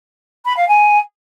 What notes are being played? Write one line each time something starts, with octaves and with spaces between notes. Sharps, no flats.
B5
F5
G#5